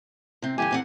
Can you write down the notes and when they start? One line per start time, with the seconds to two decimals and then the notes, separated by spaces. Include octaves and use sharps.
0.42 C3 C4
0.58 E2 G2 D3 G4 G#5
0.71 E2 C4 F#5